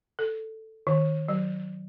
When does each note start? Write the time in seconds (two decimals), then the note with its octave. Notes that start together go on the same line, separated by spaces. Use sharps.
0.19 A4
0.87 D#3
1.28 F#3